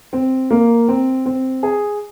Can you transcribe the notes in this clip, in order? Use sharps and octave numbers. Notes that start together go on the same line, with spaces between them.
C4
A#3
C4
C4
G#4